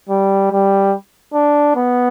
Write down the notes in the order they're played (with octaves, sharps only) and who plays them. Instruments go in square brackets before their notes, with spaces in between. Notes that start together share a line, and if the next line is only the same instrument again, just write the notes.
[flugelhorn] G3
G3
D4
B3